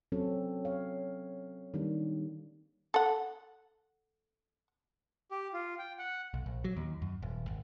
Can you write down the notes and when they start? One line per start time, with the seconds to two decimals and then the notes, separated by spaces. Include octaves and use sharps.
0.12 F#3 C4 C#4 A4 C#5
0.65 C#5 F5
1.74 D#3 G3 A#3 D4
2.94 A4 F#5
5.31 G4
5.53 F4
5.79 G5
5.99 F#5
6.34 B1
6.46 A#1
6.64 F#3
6.76 D#2
7.02 F#2
7.22 D#1
7.47 G#1